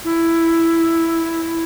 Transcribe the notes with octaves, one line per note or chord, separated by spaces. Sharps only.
E4